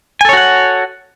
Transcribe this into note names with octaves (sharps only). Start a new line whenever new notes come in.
F#4 A4 C#5 F#5 G#5